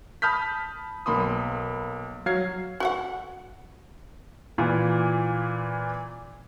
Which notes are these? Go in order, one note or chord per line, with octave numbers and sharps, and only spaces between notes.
A5 B5 D#6 F6 G6 B6
B1 A#3 B5 C6 D#6
F#3 F5 F6 G#6 C7
F#4 E5 F#5
A#2 E3 F4